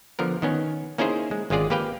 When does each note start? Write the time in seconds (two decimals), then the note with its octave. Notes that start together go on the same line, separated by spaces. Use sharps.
0.19 D3 F3 B3 A#4
0.42 D#3 B3 C#4
0.98 A#3 C#4 D#4 E4 G#4 C5
1.31 G#3
1.50 G#1 G#3 C#4 F4 G#4 D5
1.70 A#3 G4 B4 F5 G5